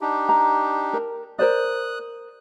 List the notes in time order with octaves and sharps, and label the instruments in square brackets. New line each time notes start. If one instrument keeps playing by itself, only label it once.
[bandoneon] D4 D#4 G4
[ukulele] A#5
A#4
[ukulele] A#4 C5 D5 [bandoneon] D#6 F#6